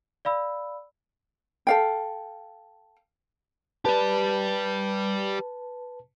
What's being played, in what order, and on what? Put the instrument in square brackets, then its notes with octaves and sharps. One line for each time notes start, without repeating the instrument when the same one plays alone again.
[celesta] D5 F5 B5 E6
[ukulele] A4 F5 G5
[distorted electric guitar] G4 D5 [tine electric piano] B4 A5